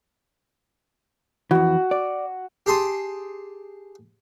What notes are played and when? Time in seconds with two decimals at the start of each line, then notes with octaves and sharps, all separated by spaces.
1.51 F2 E3 F#4
1.91 D5
2.66 G4 G#4 A5 C6 D#6